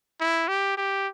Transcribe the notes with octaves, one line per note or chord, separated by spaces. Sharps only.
E4
G4
G4